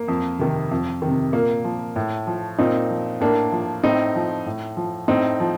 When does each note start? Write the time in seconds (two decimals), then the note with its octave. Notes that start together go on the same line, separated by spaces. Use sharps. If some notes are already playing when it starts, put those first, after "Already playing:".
Already playing: A#3
0.08 F2
0.39 C3 D#3
0.71 F2
1.02 D#3
1.07 C3
1.33 A#2 A#3
1.64 F3
1.96 A2
2.27 F3
2.59 A#2 C4 D#4
2.90 F3
3.21 A2 A#3 D4
3.52 F3
3.84 A2 C4 D#4
4.15 F3
4.46 A2
4.77 F3
5.08 A2 C4 D#4
5.40 F3